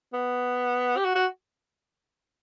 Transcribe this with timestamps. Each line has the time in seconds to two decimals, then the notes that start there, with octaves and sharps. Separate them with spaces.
0.14 B3
0.97 G4
1.05 F#4
1.15 F#4